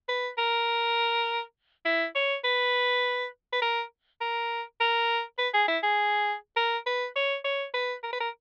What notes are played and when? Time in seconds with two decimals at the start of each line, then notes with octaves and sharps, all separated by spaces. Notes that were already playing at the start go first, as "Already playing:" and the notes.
0.09 B4
0.38 A#4
1.85 E4
2.15 C#5
2.44 B4
3.53 B4
3.62 A#4
4.21 A#4
4.80 A#4
5.38 B4
5.54 G#4
5.68 E4
5.83 G#4
6.56 A#4
6.86 B4
7.16 C#5
7.44 C#5
7.74 B4
8.03 A#4
8.13 B4
8.20 A#4